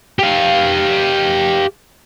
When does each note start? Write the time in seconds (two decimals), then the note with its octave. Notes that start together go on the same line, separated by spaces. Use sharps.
0.19 G4 F5